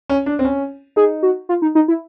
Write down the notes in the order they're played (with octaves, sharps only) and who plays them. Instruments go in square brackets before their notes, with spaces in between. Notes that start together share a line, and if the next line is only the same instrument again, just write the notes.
[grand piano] C#4
D4
C4
C#4
[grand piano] D#4 [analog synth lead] G#4
[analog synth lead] F#4
F4
D#4
D#4
E4